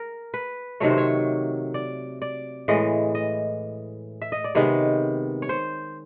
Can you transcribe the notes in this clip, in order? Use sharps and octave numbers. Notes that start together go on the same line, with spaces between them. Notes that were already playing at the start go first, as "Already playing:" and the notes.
Already playing: A#4
B4
C3 D#3 F#3 A3 C#5
C5
C#5
D5
D5
A2 E3 G#3 D#5
D#5
E5
D#5
D5
C3 D#3 G#3 B3 C#5
C#5
C5